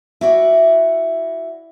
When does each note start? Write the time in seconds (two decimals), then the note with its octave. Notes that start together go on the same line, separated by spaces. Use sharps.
0.21 E4 F#4 D5